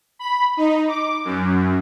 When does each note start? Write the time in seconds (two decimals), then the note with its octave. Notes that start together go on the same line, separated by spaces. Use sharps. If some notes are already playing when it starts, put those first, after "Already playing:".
0.19 B5
0.57 D#4
0.88 D6
1.25 F#2